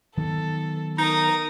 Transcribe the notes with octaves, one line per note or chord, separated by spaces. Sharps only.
D#3 F#3 B3 A4
D#4 A#4 A#5 D#6